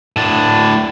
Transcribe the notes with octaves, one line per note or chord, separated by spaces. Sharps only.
A2 D4